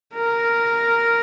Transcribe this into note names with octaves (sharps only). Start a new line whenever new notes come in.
A#4